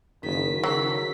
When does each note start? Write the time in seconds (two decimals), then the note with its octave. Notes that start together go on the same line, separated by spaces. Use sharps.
0.23 F#1 D#3 B6
0.64 C#3 F#3 A4 B6